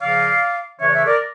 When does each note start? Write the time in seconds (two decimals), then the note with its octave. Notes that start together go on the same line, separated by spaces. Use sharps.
0.01 C#3 F3 A#3 D5 F5
0.80 C#3 E3 A3 D4 C#5 E5
0.88 D5
0.93 C#5 E5
1.06 A#4 D5